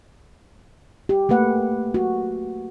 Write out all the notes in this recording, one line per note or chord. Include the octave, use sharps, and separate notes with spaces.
G4
A3 A#3 B4 F#5
F#4